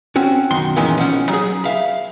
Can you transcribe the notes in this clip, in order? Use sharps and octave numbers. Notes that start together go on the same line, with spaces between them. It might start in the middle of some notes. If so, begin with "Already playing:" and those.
C4 C#4 F#4
B1 F#2 D#3 F#4 C6
A#2 D#3 E3 G#3 C#4
B1 F3 C#4 F#5
F#3 G#4
E5 F5 B5